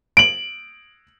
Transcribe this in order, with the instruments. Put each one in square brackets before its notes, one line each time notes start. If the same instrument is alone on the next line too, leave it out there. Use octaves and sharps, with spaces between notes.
[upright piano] D7 F#7